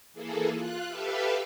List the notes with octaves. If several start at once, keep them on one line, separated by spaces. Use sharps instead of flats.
E3 A#3 G#4 A4
F4 F#6
G4 A4 B4 E5 F5